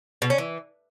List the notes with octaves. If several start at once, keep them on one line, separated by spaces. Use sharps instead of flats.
B2
C#4
E3